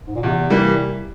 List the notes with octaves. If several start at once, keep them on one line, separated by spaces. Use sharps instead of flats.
G#2
A#2
E2 C3
E3 G3 A#3